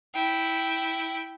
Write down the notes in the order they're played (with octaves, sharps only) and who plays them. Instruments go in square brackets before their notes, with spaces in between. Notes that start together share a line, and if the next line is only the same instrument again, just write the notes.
[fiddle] E4 G5